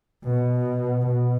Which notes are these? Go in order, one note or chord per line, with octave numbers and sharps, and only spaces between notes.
B2
B2